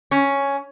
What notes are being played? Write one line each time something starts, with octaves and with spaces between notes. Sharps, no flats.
C#4